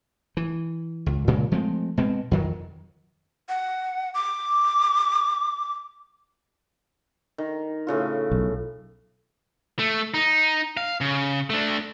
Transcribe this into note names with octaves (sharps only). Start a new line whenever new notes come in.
E3
C#2
A#2 C#3 G#3 A#3
F3 G#3 A3 C4
B2 G#3 C4
F2 D#3 F#3
F#5
D6
D#3
A2 C#3 F4
B1
A3
D#4
F5
C#3
A3 D4